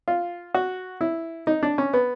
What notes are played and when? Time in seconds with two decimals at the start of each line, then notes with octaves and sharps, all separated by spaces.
0.08 F4
0.54 F#4
1.01 E4
1.47 D#4
1.63 D4
1.78 C#4
1.93 B3